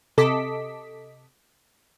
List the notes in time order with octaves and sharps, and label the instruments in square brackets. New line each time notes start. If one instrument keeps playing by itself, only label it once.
[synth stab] C3 A4 D#5 D6 B6